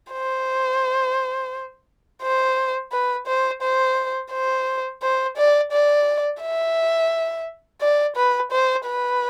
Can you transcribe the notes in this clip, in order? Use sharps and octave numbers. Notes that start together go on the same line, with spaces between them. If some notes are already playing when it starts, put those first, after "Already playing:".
C5
C5
B4
C5
C5
C5
C5
D5
D5
E5
D5
B4
C5
B4